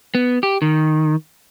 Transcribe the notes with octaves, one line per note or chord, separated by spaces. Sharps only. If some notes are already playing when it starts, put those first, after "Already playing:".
B3
G4
D#3